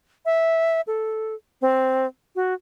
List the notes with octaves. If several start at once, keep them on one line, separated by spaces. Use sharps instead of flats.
E5
A4
C4
F#4